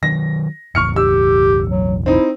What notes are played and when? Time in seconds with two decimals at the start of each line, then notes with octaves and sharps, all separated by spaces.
0.03 D#3 F#3 A#6
0.75 E1 A1 C#6 F6 C#7
0.96 G4 E6
1.68 F#3
2.06 C4 D#4 E4